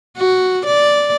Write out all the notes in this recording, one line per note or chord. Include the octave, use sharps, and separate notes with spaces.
F#4
D5